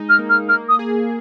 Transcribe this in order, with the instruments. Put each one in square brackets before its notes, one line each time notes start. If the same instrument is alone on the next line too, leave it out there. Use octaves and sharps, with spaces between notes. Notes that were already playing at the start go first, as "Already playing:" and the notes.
Already playing: [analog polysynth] G#3 D#4
[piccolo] F6
[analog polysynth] A#3
[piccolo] F6
[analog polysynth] A#3 [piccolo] F6
[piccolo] D#6
[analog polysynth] G#4